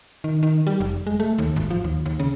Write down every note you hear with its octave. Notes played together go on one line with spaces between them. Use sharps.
D#3
D#3
G3
F1
G#3
A3
D#2
G#1
F3
D#2
D#2
C#3